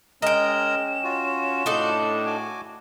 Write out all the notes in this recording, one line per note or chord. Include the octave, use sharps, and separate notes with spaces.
G#3 C#4 A#4 D#5 G5 A#5 E7
F4 F#4
A2 D4 D#4 A4
F#4 G#5 D6